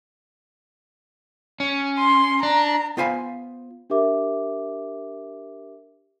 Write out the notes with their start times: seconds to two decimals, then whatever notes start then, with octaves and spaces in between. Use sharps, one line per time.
1.60 C#4
1.99 C6
2.43 D4 A#5
2.97 B3 F4 C5 F5 G#5 B5
3.90 D4 G4 A#4 E5 D6